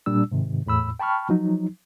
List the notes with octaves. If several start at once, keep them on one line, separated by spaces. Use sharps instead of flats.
A#2 G3 D4 E6
G#2 C3 D#3
E2 A2 B5 E6
G5 A5 B5 C#6 F6
F3 F#3 D#4